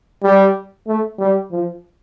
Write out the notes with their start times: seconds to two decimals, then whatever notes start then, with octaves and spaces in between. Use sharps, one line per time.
0.23 G3
0.87 A3
1.19 G3
1.52 F3